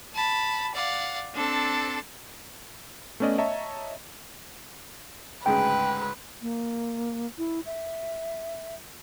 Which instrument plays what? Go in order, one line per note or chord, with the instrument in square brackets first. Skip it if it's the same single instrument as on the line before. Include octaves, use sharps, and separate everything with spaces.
[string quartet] A5 B5
D5 F5 F#5
C4 D4 A4 A5
[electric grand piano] A3 B3 C#4 D5 D#5
C#5 D#5 E5 A5 A#5 C#6
[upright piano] D2 G#2 C#3 [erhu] B4 [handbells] G5
[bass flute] A#3
E4
E5